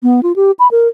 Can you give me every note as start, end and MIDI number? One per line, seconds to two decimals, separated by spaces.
0.03 0.20 59
0.23 0.32 65
0.36 0.51 67
0.59 0.68 83
0.71 0.88 70